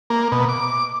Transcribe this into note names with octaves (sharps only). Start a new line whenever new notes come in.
A#3
B2
D6